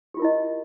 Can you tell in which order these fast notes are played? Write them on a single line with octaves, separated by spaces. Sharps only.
G4 F4 A#4 E4 D#5